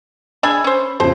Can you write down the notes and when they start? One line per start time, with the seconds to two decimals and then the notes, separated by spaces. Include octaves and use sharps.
0.43 D4 G#4 G#5 B5 E6
0.64 C#4 C5
1.00 F2 C#3 C5